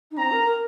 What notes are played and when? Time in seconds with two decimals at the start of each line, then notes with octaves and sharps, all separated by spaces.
0.11 D#4
0.17 C4 A#5
0.31 A#4
0.44 A#4